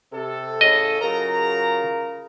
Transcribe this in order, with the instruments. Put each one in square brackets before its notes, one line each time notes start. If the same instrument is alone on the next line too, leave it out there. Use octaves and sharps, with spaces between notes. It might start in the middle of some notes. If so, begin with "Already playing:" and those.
[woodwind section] C3 [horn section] A4
[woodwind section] A2 C#3 [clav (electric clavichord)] D#5
[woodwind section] C#3 F4 A#4 [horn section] F#3 G#4 A#5